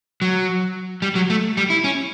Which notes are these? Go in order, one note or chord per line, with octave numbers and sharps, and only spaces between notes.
F#3
G3
F#3
A3
G3
E4
C#4